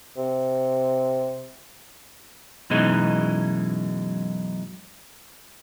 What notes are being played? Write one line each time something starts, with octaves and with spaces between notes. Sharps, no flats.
C3
F#2 B2 E3 G#3 D#4